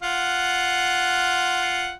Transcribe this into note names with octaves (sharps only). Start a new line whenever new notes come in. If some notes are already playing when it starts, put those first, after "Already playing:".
F4 F#5